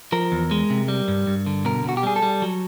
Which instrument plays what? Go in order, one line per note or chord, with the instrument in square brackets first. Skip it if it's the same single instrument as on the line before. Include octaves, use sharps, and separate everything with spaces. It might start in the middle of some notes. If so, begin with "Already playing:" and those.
[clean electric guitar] F3 A#4
E2
G#3
C3
G3
G2
G2
D3
B2 A#4
B2 F#4
G4
G3 G#4
A4
G3
F#3